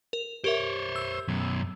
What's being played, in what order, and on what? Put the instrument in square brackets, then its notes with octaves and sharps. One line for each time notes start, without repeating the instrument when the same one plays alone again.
[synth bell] A#4
[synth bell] G4 A#4 E5 [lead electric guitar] C5 C#5
[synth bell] E6
[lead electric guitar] F#2 B2